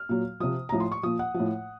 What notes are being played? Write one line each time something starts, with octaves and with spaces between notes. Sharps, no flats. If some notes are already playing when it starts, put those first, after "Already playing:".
Already playing: F6
A#2 F#3
C3 F3 D#6
A2 F3 A#5
C6
C#6
A#2 F3 D#6
F#5
F3
A2